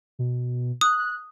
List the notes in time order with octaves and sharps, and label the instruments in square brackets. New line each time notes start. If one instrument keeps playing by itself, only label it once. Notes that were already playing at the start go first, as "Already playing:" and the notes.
[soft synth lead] B2
[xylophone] D#6 [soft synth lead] F#6